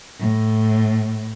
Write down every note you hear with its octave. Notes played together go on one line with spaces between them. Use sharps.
A2